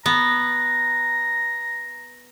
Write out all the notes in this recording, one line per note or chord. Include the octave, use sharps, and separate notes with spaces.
B3 A#5